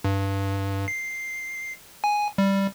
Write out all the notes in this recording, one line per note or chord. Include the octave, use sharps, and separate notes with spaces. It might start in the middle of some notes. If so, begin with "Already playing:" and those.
G2
C7
G#5
G3